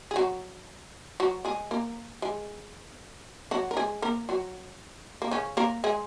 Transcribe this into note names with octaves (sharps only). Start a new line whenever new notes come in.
G#4
F#3 F#4
F#3 F#4
G#3 G#4
A#3 A#4
G#3 G#4
F#3 F#4
A#4
G#3 G#4
A#3 A#4
F#3 F#4
A#3
C#3 C#4
A#3 A#4
G#3 G#4